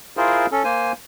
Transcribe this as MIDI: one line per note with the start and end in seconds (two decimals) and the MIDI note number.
0.17 0.46 64
0.17 0.46 65
0.17 0.46 68
0.17 0.46 70
0.17 0.46 72
0.52 0.63 61
0.52 0.63 69
0.64 0.92 58
0.64 0.92 72
0.64 0.92 80